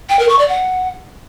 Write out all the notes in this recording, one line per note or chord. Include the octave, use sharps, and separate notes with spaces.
G5
A#4
C#6
D5
F#5